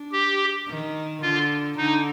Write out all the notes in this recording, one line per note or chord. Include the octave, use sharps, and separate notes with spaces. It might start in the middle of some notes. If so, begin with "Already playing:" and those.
Already playing: D4
G4
D#3
D3 F4
D3 D#4